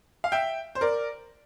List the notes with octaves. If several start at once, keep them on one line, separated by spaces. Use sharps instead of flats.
F5
E5 G5
C5
A#4 D5